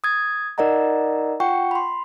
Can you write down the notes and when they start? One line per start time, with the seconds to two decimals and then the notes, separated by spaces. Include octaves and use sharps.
0.04 D#6 G#6 A6
0.58 D#4 A#4 D5 D#5 F#5 A#5
1.40 F4 F#5 G5 C#6
1.71 B5 C6